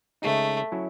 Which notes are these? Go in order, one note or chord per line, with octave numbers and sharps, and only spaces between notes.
C#3 G#3 A3 D#4
F#3 C#4 E4